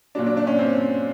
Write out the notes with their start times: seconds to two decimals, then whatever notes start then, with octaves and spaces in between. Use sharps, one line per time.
0.15 A#2 F#3 D4
0.26 D4
0.37 D4
0.47 C#4
0.59 C4